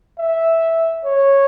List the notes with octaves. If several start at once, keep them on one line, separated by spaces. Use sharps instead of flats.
E5
C#5